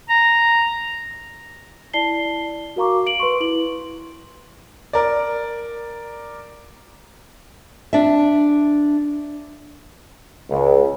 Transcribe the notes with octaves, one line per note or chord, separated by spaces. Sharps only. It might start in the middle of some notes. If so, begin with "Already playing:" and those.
A#5
E4 D5 A5 C7 G7
F#4 A#4 F5 A#5 C#6 D6
F5 D7 F#7
B4 C6 C#6
E4 F#7
A#4 D5
D4 E5
C#2